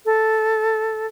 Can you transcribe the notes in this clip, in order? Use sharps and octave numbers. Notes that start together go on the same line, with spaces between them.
A4